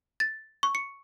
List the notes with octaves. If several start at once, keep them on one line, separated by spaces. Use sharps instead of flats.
A6
C#6
C#7